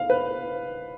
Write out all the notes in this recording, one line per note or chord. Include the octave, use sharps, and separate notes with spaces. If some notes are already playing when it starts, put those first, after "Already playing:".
Already playing: F5
B4